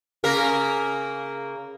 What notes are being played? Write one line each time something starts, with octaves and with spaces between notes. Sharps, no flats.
C#3 A#3 A#4